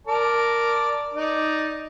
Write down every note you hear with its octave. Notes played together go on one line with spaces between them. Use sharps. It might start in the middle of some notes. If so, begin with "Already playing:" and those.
A#4 D5 A5
D#4 D5